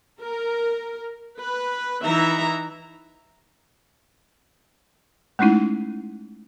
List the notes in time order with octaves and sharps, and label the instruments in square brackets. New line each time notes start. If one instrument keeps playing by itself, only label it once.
[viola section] A#4
B4
E3 D#4 E5 A#5
[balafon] G#3 A3 C#4 D#4 E4